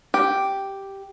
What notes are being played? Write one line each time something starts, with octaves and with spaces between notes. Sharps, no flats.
G4